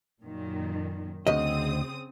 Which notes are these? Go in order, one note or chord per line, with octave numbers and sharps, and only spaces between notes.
F#2 A#2 D#3
D2 C#3 C4 D#5 D#6